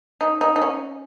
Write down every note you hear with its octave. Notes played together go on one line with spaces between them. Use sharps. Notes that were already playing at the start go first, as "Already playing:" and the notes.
D#4
D#4
D#4
C#4